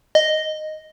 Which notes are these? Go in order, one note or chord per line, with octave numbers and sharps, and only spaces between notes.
D#5